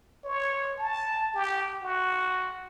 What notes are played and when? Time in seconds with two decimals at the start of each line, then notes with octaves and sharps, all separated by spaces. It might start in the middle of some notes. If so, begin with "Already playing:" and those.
0.24 C#5
0.79 A5
1.35 G4
1.82 F#4